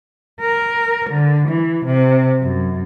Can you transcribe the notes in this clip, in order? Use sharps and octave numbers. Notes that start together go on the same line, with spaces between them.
A#4
D3
E3
C3
F#2